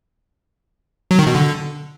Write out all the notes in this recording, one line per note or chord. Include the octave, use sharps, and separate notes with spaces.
F#3
D#3
B2
D3